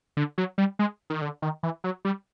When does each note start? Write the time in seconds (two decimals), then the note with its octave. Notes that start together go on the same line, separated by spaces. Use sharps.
0.17 D3
0.38 F#3
0.58 G3
0.79 G#3
1.10 D#3
1.22 D3
1.42 D#3
1.63 E3
1.84 F#3
2.05 G3